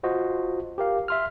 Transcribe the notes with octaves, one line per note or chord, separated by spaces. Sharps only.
F4 F#4 C5 D#5
G4 A#4 F5
E5 C6 F6